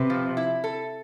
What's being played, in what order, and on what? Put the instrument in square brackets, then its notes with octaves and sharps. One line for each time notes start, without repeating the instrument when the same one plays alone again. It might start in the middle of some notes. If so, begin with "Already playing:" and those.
Already playing: [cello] C3 [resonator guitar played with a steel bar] B4
[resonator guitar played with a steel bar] F3
E4
A4